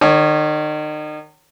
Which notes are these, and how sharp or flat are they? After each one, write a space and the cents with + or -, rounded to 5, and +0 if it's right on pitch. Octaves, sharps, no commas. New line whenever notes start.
D#3 -35 C#5 +0